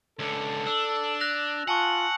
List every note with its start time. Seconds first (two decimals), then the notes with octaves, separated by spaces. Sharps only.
0.19 C#2 D3 A4
0.67 D4 E6
1.20 F#6 A#6 F7
1.68 F4 F#5 G#5 A5 C#6